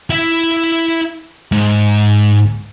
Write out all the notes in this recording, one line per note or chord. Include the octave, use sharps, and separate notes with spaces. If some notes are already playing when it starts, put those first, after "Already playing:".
E4 E5
G#2